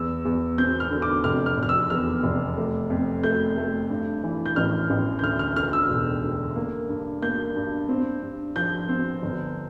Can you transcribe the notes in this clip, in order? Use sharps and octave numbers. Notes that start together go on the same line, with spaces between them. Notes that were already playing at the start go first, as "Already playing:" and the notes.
Already playing: E2 E6
E2
C4 G6
F6
D3
D6
F1 F6
F6
F1 F6
E6
E2 F6
F1
A3
F2
A3 G6
A3
G2
E3
G6
A1 F6
A1
G6
D2 F6
F6
D3 F6
E6
E1
D3
A#3
G2
A#3 G6
G2
C4
G2
F3 G6
C4
G1